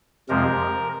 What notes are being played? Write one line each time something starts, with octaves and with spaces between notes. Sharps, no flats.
F2 C3 F3 G#3 C4 A#4